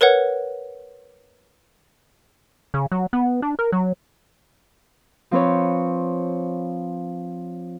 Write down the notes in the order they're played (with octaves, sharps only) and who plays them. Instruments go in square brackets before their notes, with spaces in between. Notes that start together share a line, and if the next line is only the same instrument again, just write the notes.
[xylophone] A#4 B4 C#5 F#5
[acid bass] C#3
F#3
B3
D4
A#4
F#3
[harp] F3 C4 B4 C#5